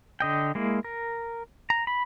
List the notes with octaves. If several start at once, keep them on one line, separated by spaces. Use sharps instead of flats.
D3 D#5 G5
G#3 A#3 E4
A#4
A#5
B5